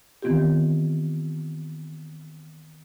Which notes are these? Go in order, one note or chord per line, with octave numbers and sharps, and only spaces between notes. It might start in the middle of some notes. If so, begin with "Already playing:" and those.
D#3 E3 B3 C4 F4 G4